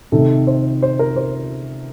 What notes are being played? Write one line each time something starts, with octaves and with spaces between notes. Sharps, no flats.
C3 D#3 A3 A4
C5
C5
A#4
C5